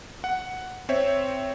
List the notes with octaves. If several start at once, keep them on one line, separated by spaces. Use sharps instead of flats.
F#5
C4 C5 C#5 E5